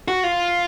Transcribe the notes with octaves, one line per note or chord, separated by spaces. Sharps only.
F#4
F4